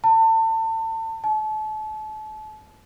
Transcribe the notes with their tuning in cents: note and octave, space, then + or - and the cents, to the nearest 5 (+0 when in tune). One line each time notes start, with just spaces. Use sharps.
A5 +30
A5 -35